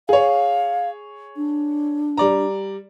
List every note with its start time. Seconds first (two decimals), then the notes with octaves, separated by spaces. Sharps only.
0.09 G#4 C#5 F5
1.37 D4
2.17 G3 D5 A#5